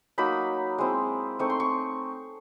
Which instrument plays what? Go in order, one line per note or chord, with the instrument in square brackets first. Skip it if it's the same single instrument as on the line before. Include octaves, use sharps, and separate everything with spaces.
[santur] F#3 A#3 D#4 B5
G#3 C4 E4
A3 C4 D#4 C#6
C6
C#6